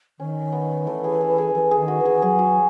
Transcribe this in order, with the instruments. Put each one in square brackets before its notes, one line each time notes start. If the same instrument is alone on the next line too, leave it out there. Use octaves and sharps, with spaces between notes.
[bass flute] D#3 [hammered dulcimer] C#4
[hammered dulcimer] B3
[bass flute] E3 [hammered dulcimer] A3
[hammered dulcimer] G#4
A4
G#4
[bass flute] E3 [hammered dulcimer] A4
[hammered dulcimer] G#4
[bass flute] D#3
[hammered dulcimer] F#4
[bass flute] E3
[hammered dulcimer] G#4
[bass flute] F#3 [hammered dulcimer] G#4
[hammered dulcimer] F#4